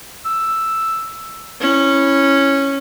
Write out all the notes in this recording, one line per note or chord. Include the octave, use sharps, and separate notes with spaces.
E6
C#4 E4